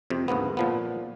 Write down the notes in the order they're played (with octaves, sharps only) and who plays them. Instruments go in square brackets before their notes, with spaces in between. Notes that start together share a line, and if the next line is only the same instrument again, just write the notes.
[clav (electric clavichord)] F2 C3
D2 G#2 A#3 B3
A#2 F3 B3